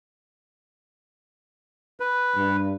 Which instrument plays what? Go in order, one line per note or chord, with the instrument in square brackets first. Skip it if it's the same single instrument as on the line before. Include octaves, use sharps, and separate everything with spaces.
[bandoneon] B4
[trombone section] G2